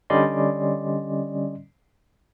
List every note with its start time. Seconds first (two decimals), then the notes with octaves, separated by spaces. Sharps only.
0.10 D3 G3 C#4 D5 D#5 C6